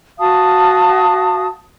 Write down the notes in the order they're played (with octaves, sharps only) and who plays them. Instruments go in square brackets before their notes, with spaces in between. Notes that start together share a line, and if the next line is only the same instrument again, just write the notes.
[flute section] F#4 F5 A5 D#6